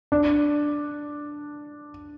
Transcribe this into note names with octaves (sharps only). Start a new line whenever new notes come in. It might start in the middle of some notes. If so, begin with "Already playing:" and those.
D4